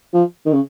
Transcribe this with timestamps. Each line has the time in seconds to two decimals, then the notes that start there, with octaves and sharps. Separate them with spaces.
0.14 F3
0.46 D#3
0.53 C#3